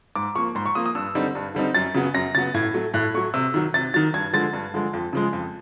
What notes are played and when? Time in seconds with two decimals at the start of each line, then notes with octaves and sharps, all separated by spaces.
0.16 G#2 D6
0.35 F3 A#3 C#6
0.55 G#2 C6
0.66 C#6
0.75 F3 A#3 D#6
0.86 D#6
0.95 G2 E6
1.15 D3 G3 C4 D#4
1.35 G2
1.55 D3 G3 C4 D#4
1.74 F#2 A6
1.94 C#3 F#3 B3
2.14 F#2 A#6
2.35 C#3 F#3 B3 A6
2.54 A2 G#6
2.74 F#3 A3
2.94 A2 F#6
3.14 F#3 A3 C#6
3.34 C3 E6
3.54 D#3 F#3
3.74 C3 A6
3.94 D#3 F#3 A6
4.14 G2 G#6
4.33 D3 F3 G#3 A6
4.53 G2
4.74 D3 F3 G#3
4.93 F2
5.13 C#3 F3 G#3
5.33 F2